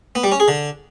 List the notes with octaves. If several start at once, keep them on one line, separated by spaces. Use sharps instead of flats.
B3
G3
C#4
G#4
D3